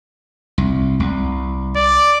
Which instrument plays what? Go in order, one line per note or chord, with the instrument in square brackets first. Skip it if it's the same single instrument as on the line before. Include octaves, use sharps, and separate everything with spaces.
[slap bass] C2
C2
[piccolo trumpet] D5